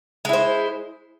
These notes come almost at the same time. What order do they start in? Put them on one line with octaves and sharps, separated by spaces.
G#3 E4 C5